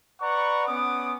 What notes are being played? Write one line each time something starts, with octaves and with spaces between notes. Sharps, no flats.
B4 D5 F#5 A#5 B5 C#6
B3 C#4 D6 D#6